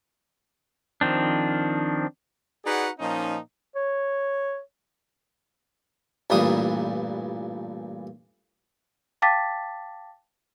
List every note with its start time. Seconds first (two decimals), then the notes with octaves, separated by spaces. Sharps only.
1.01 D#3 F3 C4 D4
2.65 D#4 F#4 G#4 B4 D5 F#5
2.99 A#2 F3 C#4 D#4
3.75 C#5
6.30 A1 G2 A#2 E3 D4 D#6
9.22 F5 G5 A5 D6 A6 B6